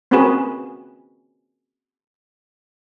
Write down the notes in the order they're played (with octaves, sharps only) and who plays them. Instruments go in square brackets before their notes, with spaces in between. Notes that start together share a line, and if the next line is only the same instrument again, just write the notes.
[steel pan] A#3 C4 C#4 F#4 G#4 B4